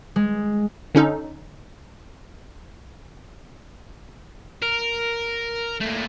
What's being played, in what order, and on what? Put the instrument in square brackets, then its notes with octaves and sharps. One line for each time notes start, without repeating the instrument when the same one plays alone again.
[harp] G#3
[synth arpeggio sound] D3 C#4 D#4 A4
[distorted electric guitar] A#4
A#2 A3